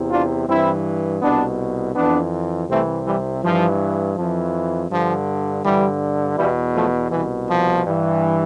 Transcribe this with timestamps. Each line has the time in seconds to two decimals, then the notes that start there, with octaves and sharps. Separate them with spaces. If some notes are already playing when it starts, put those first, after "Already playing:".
Already playing: E2 C3 E3
0.11 D4 F4
0.48 G2 E3 C4 E4
1.22 C2 B2 B3 D4
1.95 F2 E3 B3 D4
2.69 C2 C3 E3 A3 C4
3.06 E3 G3
3.43 G2 E3 F3
4.17 F2 E3 F3
4.90 G2 D3 F3
5.63 G2 D3 E3 G3
6.37 E2 B2 E3 G3
6.74 F3 A3
7.10 C2 B2 E3
7.48 F3
7.84 G2 E3